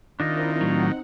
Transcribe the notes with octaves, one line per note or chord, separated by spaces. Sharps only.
D#3 C4 D4 E4 F4 A#4 D#5
A2 F#3 C4 D#4 F#5